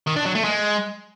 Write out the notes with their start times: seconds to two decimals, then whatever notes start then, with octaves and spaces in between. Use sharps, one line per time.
0.07 D#3
0.16 D4
0.26 F#3
0.35 A3
0.44 G#3